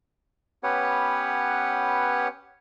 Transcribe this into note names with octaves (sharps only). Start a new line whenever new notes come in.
B3 C#4 G4 B4 C#5 F#5